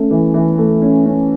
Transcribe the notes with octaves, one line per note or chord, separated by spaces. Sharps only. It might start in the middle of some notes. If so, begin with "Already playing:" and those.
Already playing: A3 C#4
E3
E3
A3
C#4
C#4